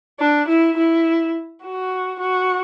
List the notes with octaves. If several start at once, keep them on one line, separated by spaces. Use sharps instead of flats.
D4
E4
E4
F#4
F#4